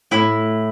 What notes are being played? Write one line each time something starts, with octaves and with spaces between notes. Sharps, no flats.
A2 E4